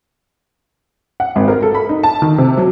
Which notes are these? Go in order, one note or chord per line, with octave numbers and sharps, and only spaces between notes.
F#5
G#1
A#4
A4
B5
D#4
A5
D#3
C3
F#3